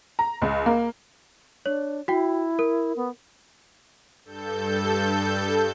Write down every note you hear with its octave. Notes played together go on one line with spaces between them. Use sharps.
A#5
C#2
A#3
D4 C#5
E4 F#4 G5
A#4
B3
G2 A4 G6